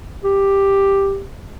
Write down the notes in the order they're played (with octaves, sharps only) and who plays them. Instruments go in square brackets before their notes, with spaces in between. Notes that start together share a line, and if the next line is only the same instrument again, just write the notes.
[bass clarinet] G4